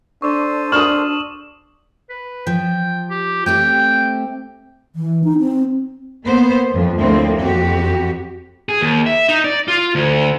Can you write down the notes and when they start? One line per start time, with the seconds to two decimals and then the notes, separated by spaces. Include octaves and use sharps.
0.22 D4 A4 C5 C#6 D6
0.72 D4 C#6 D#6 F6 E7 F#7
2.10 B4
2.47 F3 G5
3.10 G4
3.46 A3 C4 G4 G5
4.96 E3
5.24 D#4
5.39 C4
6.23 A#3 B3 C5
6.71 F2 F3
7.00 D2 A2 F3 A#3 C4
7.39 F2 F#4 G4
8.69 G#4
8.81 D#2
9.06 E5
9.29 D#4
9.44 D5
9.68 F4
9.95 D2